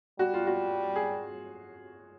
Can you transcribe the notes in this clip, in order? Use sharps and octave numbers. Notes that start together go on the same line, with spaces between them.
G3 F#4
F4
F#4
G#4